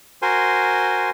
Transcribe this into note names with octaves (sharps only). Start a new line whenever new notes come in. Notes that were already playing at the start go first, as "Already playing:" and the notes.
F#4 A#4 C5 G#5 C6